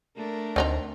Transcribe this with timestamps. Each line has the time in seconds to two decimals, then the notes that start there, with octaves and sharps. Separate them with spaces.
0.17 A3 D4 A#4
0.56 D2 C4 D#4 A#5